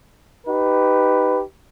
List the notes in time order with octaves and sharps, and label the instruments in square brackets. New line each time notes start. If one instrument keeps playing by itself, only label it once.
[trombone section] D#4 G4 B4